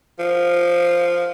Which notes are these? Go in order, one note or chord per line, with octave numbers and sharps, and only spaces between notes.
F3